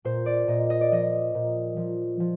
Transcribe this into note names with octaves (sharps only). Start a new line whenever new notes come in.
A#2 C5
D5
A#2 D#5
D#5
D5
F3 D#5
A#2
F3
F3